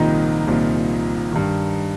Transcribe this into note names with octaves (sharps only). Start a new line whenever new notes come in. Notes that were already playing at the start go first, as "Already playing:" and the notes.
Already playing: C2 A#2 D#3 F3 D#4
C2 A#2 F3
G2 D#3